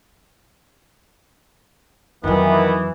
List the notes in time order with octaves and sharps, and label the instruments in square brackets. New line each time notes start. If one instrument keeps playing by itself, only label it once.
[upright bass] F2 F#3 [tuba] D#3 [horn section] E3 [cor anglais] B3